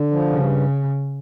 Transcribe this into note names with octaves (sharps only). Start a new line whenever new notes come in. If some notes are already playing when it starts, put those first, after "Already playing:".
Already playing: D3
F3
G2 C#3